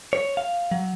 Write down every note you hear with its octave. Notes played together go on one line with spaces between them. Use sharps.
C#5
F5
F#3